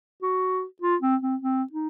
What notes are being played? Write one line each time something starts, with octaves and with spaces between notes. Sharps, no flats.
F#4
F4
C4
C4
C4
D#4